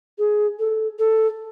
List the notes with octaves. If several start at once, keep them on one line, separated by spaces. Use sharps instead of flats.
G#4
A4
A4